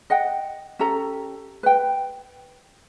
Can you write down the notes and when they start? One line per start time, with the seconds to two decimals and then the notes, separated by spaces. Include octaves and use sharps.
0.10 D#5 F#5 G5
0.79 C#4 G4 A4 A#5
1.63 B4 G5